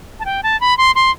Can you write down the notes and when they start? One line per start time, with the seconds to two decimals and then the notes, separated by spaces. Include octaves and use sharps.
0.20 A5
0.25 G5
0.43 A5
0.61 B5
0.78 C6
0.95 C6